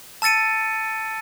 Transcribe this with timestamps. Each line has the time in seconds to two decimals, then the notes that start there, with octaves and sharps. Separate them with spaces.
0.22 A5 E6 A6 C#7 D#7